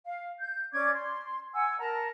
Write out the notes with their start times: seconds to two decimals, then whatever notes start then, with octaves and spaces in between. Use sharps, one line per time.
0.06 F5
0.40 G6
0.72 C#4 D5 D6 G#6
0.92 C6
1.53 F#5 G#5 E6
1.78 A#4 A5 A#5